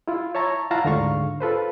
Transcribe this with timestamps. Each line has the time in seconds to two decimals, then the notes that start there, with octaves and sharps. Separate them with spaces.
0.08 E4 F4
0.35 C#5 E5 A5 A#5 C#6
0.71 E4 F4 F5 F#5 A5 A#5
0.84 D2 G#2 D3 F5 C#6
1.40 F4 A4 B4 C5